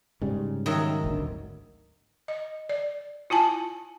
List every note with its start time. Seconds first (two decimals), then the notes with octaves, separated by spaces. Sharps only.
0.21 G#2 C#3 G3
0.66 D#3 F#3 E5
1.04 G#1 D2
2.28 D#5
2.69 D5
3.30 E4 F4 G#5 A5